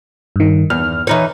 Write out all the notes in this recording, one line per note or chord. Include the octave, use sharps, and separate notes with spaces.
G2 D#3
E2 F6
E3 D#4 C#5